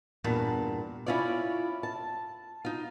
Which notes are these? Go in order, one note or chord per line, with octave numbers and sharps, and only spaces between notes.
E2 G2 A#2 A5 A#5
C#4 E4 F4 C#5 D5
A5
D#4 F4